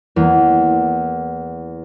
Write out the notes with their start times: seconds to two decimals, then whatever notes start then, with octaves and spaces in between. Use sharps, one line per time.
0.16 E2 A#3